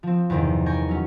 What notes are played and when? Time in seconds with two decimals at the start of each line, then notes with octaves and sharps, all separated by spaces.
0.03 F3 C4
0.30 E2 G2 C3 D#3 A#3
0.66 A#4 G#5 C#6 G6
0.88 F#3 C#4